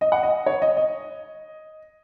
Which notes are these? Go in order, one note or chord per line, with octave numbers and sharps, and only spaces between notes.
D#5
F#5
D#5
C#5
D#5
D#5